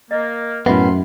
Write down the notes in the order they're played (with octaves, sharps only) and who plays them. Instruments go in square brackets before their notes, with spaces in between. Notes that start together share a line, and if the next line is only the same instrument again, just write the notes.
[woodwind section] A#3 [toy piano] D#5
[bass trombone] F#2 [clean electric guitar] A2 B3 [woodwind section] F#3 C#4 C6 [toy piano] E5 B5